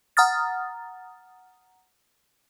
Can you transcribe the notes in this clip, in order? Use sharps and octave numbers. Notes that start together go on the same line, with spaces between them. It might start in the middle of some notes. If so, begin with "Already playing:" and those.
F#5 A#5 D#6 F6 A6